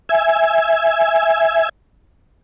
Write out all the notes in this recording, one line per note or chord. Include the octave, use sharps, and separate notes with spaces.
E5 G#5